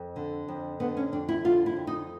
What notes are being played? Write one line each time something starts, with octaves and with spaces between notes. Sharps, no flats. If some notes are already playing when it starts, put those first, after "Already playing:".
Already playing: F2
D3
F2
D3 B3
C#4
F2 D4
E4
D3 F4
E4
F2
D#4